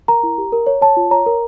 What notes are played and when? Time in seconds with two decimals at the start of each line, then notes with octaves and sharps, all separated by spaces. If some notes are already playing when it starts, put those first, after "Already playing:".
0.08 A#4 A#5
0.23 E4
0.38 G4
0.52 A#4
0.66 C#5
0.82 C#5 A5
0.97 F4
1.11 C#5 A#5
1.26 A#4